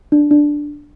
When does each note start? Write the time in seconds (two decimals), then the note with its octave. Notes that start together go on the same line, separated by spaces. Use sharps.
0.12 D4
0.31 D4